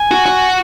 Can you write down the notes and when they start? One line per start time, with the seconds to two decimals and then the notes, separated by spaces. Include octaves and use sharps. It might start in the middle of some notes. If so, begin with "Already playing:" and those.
Already playing: G#5
0.11 F#4
0.26 F#4